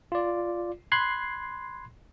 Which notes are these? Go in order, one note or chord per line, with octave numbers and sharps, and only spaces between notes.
F4 D5
B5 C6 F#6 G#6 C7